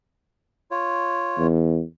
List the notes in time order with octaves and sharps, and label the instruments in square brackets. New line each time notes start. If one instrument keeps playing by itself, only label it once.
[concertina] F4 C#5
[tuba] E2